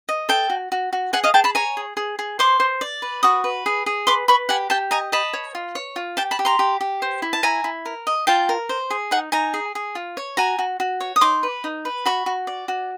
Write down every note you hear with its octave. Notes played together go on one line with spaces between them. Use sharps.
D#5
A4 G5 A5
F#4
F#4
F#4
G#4 F#5 G#5
D#5 F5
G#4 G5 A5
A5 B5
C#5 G#5 A#5
G#4
G#4
G#4
C5 C6 D6
C5
D5
B4
F#4 C#6 D#6
B4
G#4
G#4
B4 C6 D6
B4 B5 C#6
G4 F#5 G#5
G4 G5 A5
D#5 G#5 A#5
D#5 A5 B5
C#5
F4
C#5
F4
G4 G5 A5
A5 B5
G4
A#5 C6
G4
G4
C5
E4
A5
E4 G#5 A#5
E4
A#4
D#5
F4 G5 A5
A#4
C5
G#4
D#4 F#5 G#5
D#4 G#5 A#5
G#4
G#4
F4
C#5
F#4 G#5 A#5
F#4
F#4
C#5
D#6
D#4 C6 D6
B4
D#4
B4
F#4 B5 C#6
F#4
D5
F#4